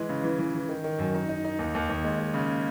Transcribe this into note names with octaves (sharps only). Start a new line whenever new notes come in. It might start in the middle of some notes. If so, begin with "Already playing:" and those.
Already playing: E3 G#3
C#3
E3
E3
E3
D#3
D#3
F#2
D#4
D#4
D#4
D#2
D#2
D#2
G#3
G#3
C#3